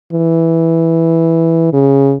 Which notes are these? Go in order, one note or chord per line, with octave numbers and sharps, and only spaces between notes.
E3
C#3